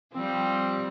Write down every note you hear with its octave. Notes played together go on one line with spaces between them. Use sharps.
F3 G3 C4